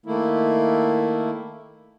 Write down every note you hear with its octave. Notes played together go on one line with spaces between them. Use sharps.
D#3 A3 A#3 E4